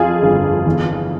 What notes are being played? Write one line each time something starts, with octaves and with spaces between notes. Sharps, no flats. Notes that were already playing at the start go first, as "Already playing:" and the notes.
Already playing: F2 F4 G#4
G1
E2